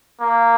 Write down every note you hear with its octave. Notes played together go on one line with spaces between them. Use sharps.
A#3